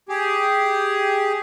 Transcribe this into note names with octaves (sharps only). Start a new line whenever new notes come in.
G4 G#4